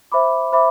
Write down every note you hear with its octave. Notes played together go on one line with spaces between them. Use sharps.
C5 E5 B5 D6
C5 E5 B5 D6